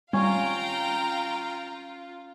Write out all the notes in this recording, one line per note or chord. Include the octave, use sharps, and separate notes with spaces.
G3 C#4 F4 F5 G5 A#5